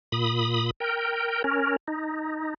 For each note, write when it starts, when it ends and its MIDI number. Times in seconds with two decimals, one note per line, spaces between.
0.12 0.71 46
0.12 0.71 83
0.12 0.71 87
0.80 1.42 70
0.80 1.42 79
1.44 1.76 61
1.44 1.76 70
1.88 2.54 63